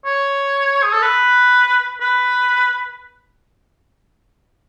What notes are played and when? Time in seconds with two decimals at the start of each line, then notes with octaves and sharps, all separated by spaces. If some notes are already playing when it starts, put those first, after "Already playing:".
0.05 C#5
0.83 G#4
0.93 A4
1.02 B4
2.01 B4